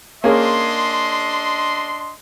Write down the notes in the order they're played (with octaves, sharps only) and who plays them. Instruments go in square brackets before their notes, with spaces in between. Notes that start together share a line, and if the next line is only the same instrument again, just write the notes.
[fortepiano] A#3 C#4 G#4 [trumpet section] D4 D#5 C6